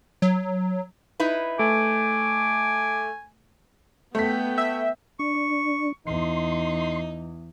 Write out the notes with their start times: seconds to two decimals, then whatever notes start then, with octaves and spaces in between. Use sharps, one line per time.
0.22 F#3
1.20 D#4 E4 B4
1.59 A3 G#5 D6
4.15 A3 B3 G5 B6
4.58 E5
5.19 D4 C#6
6.07 E2 D#4 C6